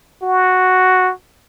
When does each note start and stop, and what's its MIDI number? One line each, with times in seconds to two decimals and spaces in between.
0.23 1.12 66